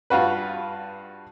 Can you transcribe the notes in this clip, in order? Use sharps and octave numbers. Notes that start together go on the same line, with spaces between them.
G2 F4 F#4 B4